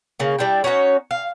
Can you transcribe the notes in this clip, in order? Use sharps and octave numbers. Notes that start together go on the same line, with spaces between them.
C#3 A#3
G3 D4 E4 G5
C#4 D#4 F#4 C#5
F5